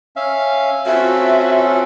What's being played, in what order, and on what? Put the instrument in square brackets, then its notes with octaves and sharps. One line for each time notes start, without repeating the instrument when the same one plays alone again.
[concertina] C#4 E5 F5
[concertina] C4 C#4 A4 [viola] F4 F#4 [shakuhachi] E5